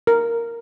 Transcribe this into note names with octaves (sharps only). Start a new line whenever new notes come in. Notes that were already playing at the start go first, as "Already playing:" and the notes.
A#4